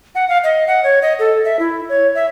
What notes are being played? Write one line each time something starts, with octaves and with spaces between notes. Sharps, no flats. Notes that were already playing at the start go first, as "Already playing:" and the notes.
F#5
F5
D#5
F#5
C#5
D#5
A4
E5
E4
C#5
E5